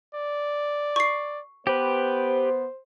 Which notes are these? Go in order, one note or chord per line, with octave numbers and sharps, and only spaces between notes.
D5
C#6 C7
B3 G4 B4 C5